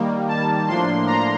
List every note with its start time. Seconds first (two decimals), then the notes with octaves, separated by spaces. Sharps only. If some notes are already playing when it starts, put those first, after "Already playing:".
Already playing: D#3 G3 A#3
0.28 A5
0.68 A2 F3 A#3 D4 C6
1.07 A#5